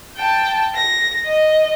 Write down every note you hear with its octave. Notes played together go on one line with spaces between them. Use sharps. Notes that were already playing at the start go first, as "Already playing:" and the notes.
G5 A5
A#6
D#5